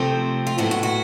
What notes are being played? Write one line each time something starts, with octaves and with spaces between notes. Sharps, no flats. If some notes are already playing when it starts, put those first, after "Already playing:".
Already playing: C3 F3 A3 C4
F4
A2 F#3 B3 F#4
F#4
F#4